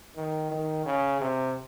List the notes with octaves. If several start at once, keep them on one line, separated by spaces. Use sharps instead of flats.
D#3
D#3
C#3
C3